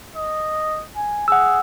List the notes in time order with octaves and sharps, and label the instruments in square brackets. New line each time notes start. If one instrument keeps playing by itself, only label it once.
[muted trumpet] D#5
G#5
[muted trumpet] G#4 [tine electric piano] F#5 E6